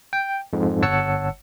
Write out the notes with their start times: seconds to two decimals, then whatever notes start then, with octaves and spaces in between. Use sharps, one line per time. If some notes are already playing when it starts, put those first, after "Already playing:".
0.13 G5
0.53 F2 G#2
0.82 G1 C#5 F#5 A5 E6 C#7